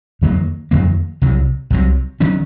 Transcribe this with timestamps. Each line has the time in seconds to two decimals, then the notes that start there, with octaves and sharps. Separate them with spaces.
0.22 F2 D#3 F#3 A#3
0.71 F2 D#3 F#3 A#3
1.22 C2 C3 F#3
1.70 C2 C3 F#3
2.20 D#3 F#3 C#4